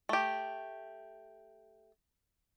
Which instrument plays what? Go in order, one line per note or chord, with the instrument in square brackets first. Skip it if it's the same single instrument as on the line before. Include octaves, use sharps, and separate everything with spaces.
[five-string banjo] A3 G4